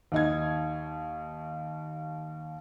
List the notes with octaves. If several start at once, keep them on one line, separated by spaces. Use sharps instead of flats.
D#2 D#4 G#6